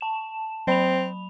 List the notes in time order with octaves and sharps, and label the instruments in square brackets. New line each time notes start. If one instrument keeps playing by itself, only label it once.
[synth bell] A5 E7
[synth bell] F#3 B5 F7 [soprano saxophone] C4